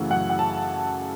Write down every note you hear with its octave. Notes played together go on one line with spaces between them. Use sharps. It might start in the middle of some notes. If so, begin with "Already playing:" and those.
Already playing: F#2 C#3 E3 A3 F#5
F#2 F#5
F#5
A5